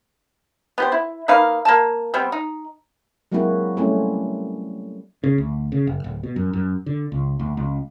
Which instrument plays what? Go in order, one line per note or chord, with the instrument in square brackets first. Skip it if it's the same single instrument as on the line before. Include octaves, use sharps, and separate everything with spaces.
[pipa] B3 G4 C5
E4
A#3 D#4 B4 F5
A#3 A5
G3 B3 C4
D#4
[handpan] F#3 G#3 A#3 C4 E4 F#4
G3 A3 C4 C#4 E4
[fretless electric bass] C#3
D2
C#3
F#1
D1
B2
F#2
F#2
D3
C#2
D2
C#2